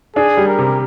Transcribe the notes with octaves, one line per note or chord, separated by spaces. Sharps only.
D4 G#4
G3
A#4
C3